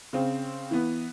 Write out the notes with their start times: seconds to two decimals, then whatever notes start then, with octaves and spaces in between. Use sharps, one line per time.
0.13 C#3 C4
0.71 E3 B3